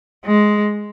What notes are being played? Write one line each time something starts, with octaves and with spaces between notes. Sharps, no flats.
G#3